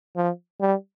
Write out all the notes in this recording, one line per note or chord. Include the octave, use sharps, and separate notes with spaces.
F3
G3